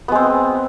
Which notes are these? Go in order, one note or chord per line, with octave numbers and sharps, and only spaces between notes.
G#3 B3 C4